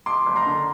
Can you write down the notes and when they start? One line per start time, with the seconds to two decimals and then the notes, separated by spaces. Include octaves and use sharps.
0.06 F2 C6 D6
0.26 F#1
0.36 A#5 C6
0.46 D3